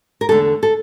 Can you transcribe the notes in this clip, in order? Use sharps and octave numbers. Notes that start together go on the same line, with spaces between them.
A#4
E2 D3 A3 A4
A4